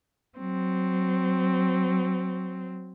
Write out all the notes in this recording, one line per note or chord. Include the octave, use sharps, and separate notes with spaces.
F#3 C4